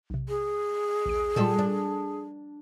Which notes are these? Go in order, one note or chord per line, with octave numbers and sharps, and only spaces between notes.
B1 C3
G#4
A#1 D#2 D7
A#2 G3 G#3 F4 A4
D4